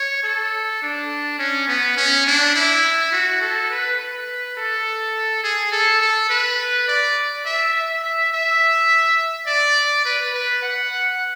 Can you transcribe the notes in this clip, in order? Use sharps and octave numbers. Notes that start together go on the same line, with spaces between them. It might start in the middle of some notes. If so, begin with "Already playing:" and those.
Already playing: C#5
A4
D4
C#4
B3
C#4
D4
E4
F#4
A4
B4
B4
A4
G#4
A4
A4
B4
D5
E5
E5
E5
E5
D5
B4
B4
F#5